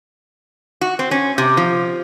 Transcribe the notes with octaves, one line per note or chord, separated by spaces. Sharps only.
F#4
C4
C#4
C3
F3